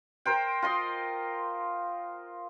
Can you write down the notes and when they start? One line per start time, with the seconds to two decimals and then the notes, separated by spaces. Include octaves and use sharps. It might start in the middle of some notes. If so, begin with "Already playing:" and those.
0.25 A#4 C5 G5
0.62 F4 D#5 C6